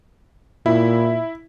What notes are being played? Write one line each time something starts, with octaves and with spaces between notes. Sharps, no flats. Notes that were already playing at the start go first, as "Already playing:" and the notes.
A#2 E4